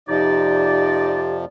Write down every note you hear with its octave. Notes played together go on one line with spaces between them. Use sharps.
F2 C3 F3 D#4 G4 D5